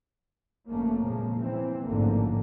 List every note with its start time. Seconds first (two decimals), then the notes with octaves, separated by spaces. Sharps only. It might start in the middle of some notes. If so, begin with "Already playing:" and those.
0.69 F#1 F2 A3 A#3 C#4
1.03 A#2 C#3 F3 G#3 A#3
1.36 E3 C4
1.86 A1 F2 G#2 D3 F3 A#3